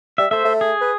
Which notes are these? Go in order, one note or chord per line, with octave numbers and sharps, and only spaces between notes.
G3 E5
A3 C5 E5
A3
G#4
B4